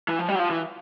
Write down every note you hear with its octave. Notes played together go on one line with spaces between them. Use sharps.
E3
F3
G3
F#3
F3
E3